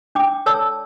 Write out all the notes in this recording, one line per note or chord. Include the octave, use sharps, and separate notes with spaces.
D4 G5 D6
A4 C#5 D5 A5 E6